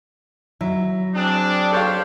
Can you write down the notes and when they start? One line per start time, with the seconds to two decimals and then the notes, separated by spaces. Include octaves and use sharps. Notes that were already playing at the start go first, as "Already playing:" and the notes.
0.61 F#3 E4
1.15 C4 D4 G#4
1.72 G4 A4 C5 C#5 F5 G5